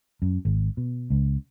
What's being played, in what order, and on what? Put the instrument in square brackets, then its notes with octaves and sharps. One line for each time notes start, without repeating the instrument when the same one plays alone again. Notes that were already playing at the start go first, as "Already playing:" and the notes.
[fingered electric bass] F#2
G#1
B2
C#2